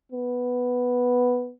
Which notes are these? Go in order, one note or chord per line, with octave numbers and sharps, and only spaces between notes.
B3